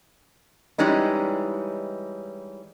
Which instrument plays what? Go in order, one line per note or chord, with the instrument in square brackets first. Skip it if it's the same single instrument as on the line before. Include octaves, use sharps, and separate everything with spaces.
[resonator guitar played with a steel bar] E3 G3 G#3 C#4 D#4